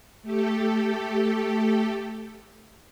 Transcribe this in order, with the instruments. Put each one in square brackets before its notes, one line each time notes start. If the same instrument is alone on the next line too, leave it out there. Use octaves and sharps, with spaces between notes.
[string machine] A3 G4 A4